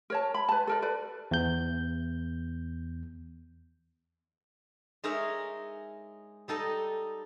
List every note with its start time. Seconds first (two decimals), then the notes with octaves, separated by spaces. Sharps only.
0.10 A#4 C#5 A5
0.34 B5
0.49 B4 A5
0.67 A4 A#4 D5
0.82 A4 B4 D5
1.31 E2 G6
5.04 G#3 D#4 G#4 A#4 C#5 E5
6.48 G3 D#4 A4 D#5